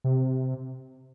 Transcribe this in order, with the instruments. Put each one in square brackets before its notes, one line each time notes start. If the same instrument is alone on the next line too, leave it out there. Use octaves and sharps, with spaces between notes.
[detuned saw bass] C3